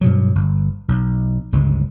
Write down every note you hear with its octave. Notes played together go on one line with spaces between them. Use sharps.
G2 B2 F#3
G1
B1
G1 C#2 C#3 G#3